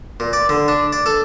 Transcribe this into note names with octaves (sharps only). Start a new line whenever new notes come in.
A#2
D5
D3
D4
D5
A4